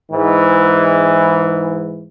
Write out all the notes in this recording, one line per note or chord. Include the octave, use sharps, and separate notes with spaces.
G#2 E3